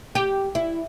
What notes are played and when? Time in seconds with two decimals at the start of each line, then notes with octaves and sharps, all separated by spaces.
0.15 G4
0.55 E4